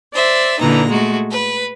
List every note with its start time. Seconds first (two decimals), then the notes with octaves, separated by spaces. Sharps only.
0.14 C5 D5 E5
0.59 A#2 D3 E3 D#4 A#5
0.89 G#3 A3 F#4
1.30 B4